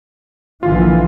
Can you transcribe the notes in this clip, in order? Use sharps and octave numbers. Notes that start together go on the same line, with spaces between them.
A#1 D3 E3 F4